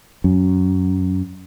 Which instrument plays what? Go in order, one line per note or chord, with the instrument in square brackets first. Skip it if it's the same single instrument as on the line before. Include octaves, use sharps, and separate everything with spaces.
[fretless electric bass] F#2